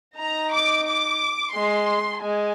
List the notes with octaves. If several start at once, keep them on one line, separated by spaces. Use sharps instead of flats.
D#4 A#5
D6
D6
G#3 C6
G#3 G#5